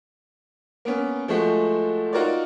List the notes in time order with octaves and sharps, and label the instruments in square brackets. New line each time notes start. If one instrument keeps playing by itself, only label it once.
[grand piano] A#3 B3 C#4
F3 G#3 A3 F#4 C5
D#4 F4 F#4 A#4 C#5 D5